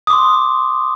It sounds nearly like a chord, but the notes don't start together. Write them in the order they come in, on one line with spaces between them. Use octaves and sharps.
D#6 D6 C6